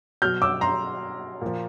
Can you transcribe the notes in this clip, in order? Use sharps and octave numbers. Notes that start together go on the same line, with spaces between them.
B2 F#3 F6 G6
D6 E6
A#5 C6
A#2 F3